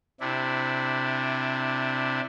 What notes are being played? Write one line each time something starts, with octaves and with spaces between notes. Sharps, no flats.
C3 D4 E4